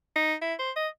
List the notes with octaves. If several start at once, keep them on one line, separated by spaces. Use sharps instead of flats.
D#4
E4
C5
D#5